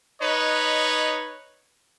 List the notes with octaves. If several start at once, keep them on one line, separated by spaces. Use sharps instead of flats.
D#4 B4 C#5 D#5